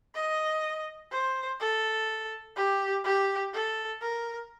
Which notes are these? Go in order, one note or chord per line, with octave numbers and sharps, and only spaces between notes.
D#5
C5
A4
G4
G4
A4
A#4